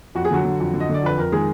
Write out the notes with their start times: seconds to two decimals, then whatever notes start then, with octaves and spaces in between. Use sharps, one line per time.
0.15 F2 F#4
0.25 G#4
0.31 D3 F#3 F#4
0.45 D3
0.60 F2
0.74 D3
0.80 D#5
0.89 D3 D5
1.03 F2 B4
1.17 F2 A#4
1.32 D#3 G#3 G#4